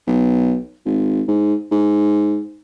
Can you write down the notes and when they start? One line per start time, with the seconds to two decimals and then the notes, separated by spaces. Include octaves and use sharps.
0.07 B1
0.85 G#1
1.28 G#2
1.71 G#2